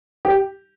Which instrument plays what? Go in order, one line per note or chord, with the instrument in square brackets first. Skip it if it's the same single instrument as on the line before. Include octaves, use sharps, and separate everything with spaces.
[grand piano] G4